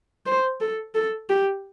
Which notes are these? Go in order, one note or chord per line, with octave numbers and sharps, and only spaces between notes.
C5
A4
A4
G4